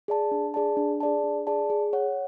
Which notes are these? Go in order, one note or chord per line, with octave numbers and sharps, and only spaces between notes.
G#4 D5 A5
D4
G#4 D5 A5
D4
G#4 D5 A5
D4
G#4 D5 A5
G#4
C#5 F#5